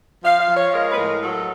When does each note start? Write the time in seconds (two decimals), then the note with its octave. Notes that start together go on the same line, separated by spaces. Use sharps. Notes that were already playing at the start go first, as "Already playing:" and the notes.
0.23 F3 F5
0.39 F5
0.48 F3
0.56 C#5
0.73 G#3 A#4
0.90 B4
0.96 A2 A#4
1.21 F#3 A4